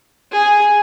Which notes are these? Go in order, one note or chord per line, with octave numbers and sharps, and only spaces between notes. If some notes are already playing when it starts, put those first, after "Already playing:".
G#4